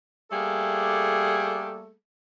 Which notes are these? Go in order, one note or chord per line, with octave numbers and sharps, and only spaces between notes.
G3 A3 A#3 G#4 A4